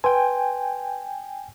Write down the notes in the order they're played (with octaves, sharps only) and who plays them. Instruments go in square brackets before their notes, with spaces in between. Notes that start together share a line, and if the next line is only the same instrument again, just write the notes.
[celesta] B4 C6 [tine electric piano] G5 G#5